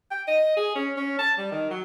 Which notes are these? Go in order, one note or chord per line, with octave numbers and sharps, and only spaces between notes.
G5
D#5
G#4
C#4
C#4
A5
G3
D#3
F#3